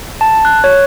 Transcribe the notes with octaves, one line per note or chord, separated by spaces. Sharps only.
A5
F#6
C#5